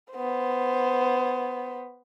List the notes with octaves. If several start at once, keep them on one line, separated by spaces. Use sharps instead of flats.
B3 C5